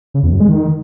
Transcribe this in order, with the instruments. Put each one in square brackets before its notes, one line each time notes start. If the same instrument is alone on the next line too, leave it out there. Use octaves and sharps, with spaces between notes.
[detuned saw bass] C#3
E2
F#2
G#3
D#3